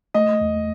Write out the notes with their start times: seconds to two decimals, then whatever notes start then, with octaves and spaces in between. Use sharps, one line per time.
0.14 A3 D#5
0.41 E2